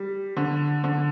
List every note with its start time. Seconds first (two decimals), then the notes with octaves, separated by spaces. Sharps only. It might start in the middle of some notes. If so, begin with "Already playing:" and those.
Already playing: G3
0.37 D3
0.84 D3